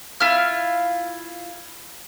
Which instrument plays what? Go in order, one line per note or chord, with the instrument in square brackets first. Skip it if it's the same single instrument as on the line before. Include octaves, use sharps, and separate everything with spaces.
[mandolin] E4 F4 F6